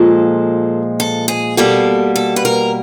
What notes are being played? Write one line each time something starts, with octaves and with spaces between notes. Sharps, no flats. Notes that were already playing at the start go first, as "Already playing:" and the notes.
Already playing: A#2 F3 G#3 A4
A4
G#4
B2 G3 A#3 A4
A4
B4
A#4